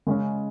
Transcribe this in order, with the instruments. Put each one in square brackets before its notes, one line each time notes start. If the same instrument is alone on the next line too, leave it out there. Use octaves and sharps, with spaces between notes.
[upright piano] C#3 G#3 C#4